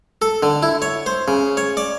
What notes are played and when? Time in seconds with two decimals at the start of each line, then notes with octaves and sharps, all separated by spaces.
0.22 A4
0.43 D3
0.63 E4
0.82 C#5
1.06 C5
1.28 C#3
1.57 C#5
1.77 D5